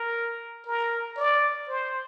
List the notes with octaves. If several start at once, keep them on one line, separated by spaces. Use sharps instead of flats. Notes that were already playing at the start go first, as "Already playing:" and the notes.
Already playing: A#4
A#4
D5
C5